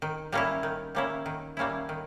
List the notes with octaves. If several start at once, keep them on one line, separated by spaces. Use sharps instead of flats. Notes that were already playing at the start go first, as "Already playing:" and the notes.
D#3
G3 A#3 C#4 E4
D#3
G3 A#3 C#4 E4
D#3
G3 A#3 C#4 E4
D#3